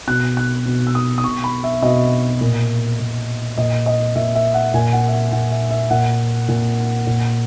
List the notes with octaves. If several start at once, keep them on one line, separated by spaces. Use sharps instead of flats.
B2 F#6
F#6
B2
E6
D#6
D#6
B2 C#6
B5
E5
B2 D#5
A#2
A#2
A#2 D#5
D#5
A#2 E5
E5
F#5
A#2 G#5
F#5
E5
F#5
A#2 F#5
E5
E5
A#2 F#5
A#2
A#2